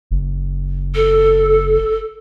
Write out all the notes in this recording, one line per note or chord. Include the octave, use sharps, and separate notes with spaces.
F#1
A4